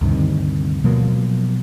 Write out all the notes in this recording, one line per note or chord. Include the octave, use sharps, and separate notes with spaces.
D2 G2 C3 D#3
B2 F3 F#3 A#3